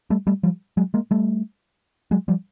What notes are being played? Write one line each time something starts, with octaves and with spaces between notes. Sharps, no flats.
G3 A3
G3 A3
F3 G3
F#3 G#3
G#3 A#3
G3 A3
F#3 G#3
F3 G3